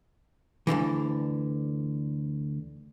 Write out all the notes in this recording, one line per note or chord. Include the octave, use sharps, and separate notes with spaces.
D2 B2 D3 E3